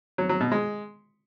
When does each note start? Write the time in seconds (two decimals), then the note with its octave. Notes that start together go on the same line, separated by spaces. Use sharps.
0.18 F#3
0.29 F#3
0.40 B2
0.52 G#3